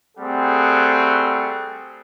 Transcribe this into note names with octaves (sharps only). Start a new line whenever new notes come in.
G3 A3 C4 G#4 F#5